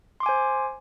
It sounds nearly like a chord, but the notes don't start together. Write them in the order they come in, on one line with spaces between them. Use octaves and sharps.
C6 D6 G#5 C5